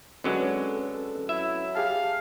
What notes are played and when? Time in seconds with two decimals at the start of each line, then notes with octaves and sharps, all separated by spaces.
0.24 D3 F#3 G#3 C4 C#4 B4 C#5
0.69 A4
1.29 F#3 E4 E5
1.75 G4 G#4 F5 A5